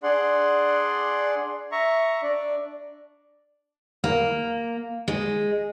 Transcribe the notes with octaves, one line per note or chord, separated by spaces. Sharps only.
D4 G#4 D5 F#5 C6
E5 A#5 C#6
D4 D5
A#3
G#3